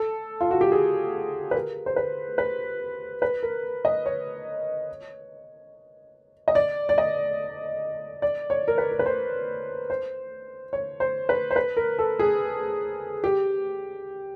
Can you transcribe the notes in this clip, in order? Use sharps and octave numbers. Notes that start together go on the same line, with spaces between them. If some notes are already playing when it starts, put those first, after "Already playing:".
Already playing: A4
F4
F#4
G4
G#4
B4
A#4
C5
B4
B4
B4
A#4
D#5
C#5
D#5
D5
D5
D#5
D5
C#5
A#4
B4
A#4
B4
C5
C5
C#5
C5
B4
C5
B4
A#4
A4
G#4
G4